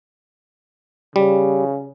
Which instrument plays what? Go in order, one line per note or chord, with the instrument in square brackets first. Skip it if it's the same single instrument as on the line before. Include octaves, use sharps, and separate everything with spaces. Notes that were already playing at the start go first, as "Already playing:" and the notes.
[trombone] C#3 [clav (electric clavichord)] G3